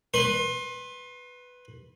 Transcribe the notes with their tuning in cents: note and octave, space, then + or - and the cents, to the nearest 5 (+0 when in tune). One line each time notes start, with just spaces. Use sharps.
B4 +0 C6 +30